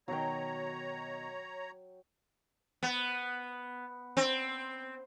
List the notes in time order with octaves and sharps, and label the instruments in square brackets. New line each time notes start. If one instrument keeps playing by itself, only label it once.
[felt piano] B2 D#3 [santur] F#3 G5 [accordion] C#5 A#5
[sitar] B3
C4